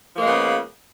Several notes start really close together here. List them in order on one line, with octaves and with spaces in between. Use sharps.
F3 A#3 G#3 B3 C#3